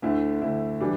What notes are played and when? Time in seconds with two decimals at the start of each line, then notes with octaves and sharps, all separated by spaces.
0.02 D2 D3 A3 E4
0.42 D2 D3 A3 E4
0.81 E3 G3 D4